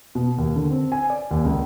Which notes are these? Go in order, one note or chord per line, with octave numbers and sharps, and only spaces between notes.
B2
D#2
D3
C4
G#5
D5
D#2
C#2